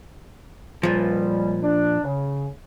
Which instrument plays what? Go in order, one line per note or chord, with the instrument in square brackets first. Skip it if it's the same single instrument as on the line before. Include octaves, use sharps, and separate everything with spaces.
[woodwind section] C#2 G3 [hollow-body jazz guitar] A#2 F3
[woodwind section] D4
C#3